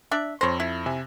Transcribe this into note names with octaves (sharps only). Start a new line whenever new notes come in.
D4 D5 E5
F2 C5 C#5 A#6
E4
C3 E5 G#5